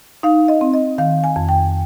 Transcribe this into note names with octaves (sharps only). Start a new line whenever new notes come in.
D#4 F5
D#5
C4
D#5
D#3 F5
G#5
F2
G5